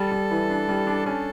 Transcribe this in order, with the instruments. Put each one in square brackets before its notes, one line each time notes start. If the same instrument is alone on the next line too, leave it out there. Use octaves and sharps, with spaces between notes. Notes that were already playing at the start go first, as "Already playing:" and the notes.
Already playing: [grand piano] G3 [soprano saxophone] A4
[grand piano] G3
E3
D4
G3
D4
[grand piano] C#4 [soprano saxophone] A4